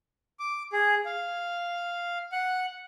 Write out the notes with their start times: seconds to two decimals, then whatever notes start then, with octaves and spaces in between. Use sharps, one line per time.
0.39 D6
0.73 G#4
1.05 F5
2.32 F#5